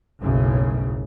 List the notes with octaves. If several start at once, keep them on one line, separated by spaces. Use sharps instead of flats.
F#1 B1 F#2 A2 C#3